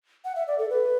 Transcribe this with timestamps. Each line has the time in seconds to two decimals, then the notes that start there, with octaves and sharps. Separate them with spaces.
0.25 F#5
0.36 E5
0.47 D5
0.59 A4
0.70 B4